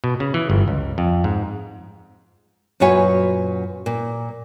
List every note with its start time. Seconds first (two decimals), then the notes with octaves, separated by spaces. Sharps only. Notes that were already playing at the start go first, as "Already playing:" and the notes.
0.04 B2
0.20 C#3
0.34 E3
0.50 G1
0.68 C#2
0.98 F2
1.24 G#2
2.80 F#2 A#2 F#4 B4 C#5 G#5
3.86 A#2